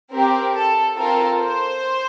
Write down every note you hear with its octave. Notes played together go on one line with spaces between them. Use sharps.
C4 G4 A#4
A4
C4 F4 A4 A#4
C5